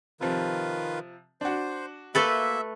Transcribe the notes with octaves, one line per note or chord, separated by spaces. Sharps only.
C3 D#3 F3 F4 B4
D4 F#4 C5
A3 A#3 A4 B4 E5